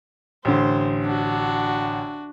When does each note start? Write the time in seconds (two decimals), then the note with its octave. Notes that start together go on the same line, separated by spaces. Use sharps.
0.45 A1 D3 C5
1.04 D4 F#4